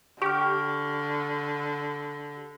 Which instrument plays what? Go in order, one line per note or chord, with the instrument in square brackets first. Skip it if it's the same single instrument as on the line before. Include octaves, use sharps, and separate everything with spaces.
[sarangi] D3 [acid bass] G4 [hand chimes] C#6 F6